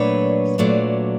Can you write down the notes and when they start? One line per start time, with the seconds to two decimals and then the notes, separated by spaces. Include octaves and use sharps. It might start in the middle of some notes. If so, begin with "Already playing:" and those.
Already playing: A#2 F#3 A3 D4 B4 C#5
0.58 A#2 F#3 A3 D4